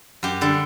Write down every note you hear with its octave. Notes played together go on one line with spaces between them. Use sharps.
F#2 G4
D3 G3